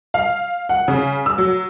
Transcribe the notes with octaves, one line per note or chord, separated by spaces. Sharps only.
F5
F#5
C#3
E6
F#3